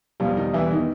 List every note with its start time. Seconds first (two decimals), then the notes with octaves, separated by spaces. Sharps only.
0.20 E2 B2 F3 G3 F4
0.37 D#3 D#4
0.54 E3 E4
0.71 D#3 D#4